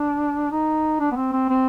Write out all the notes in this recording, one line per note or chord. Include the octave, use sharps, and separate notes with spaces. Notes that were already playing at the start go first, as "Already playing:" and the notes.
Already playing: D4
D#4
D4
B3
C4
C4
C4